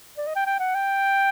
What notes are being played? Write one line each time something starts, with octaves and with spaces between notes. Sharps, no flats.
D5
D#5
G5
G5
F#5
G5